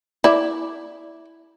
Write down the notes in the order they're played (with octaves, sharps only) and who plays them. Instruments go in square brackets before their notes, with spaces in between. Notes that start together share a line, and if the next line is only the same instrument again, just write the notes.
[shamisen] E4 D5